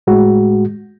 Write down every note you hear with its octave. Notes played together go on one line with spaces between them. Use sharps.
A2 G#3 F#4